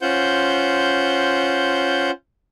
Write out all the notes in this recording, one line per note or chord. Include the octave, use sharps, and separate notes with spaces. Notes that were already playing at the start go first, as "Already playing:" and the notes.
C#4 F4 C5 F#5 G6